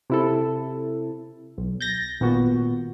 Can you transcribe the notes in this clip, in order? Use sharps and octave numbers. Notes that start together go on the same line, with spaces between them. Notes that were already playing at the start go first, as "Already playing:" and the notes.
C3 E4 A4
B1
G6 A6 A#6
G#1 A#2 B3 F#4